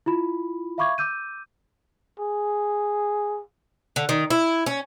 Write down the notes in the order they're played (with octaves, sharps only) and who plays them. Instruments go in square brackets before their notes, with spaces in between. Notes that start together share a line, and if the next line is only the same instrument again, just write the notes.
[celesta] E4 F4 B5
E5 F5 B5 C#6 D6 G#6
D6 E6 G6 D#7
[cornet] G#4
[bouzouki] D3
D#3
E4
C#4